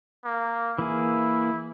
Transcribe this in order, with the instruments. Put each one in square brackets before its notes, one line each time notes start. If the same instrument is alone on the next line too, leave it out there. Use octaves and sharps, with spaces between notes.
[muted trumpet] A#3
[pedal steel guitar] E3 A#3 G#4 [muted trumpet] E4